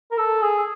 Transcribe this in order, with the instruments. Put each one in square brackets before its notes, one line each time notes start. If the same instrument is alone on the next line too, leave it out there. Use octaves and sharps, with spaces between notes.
[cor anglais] A#4
A4
G#4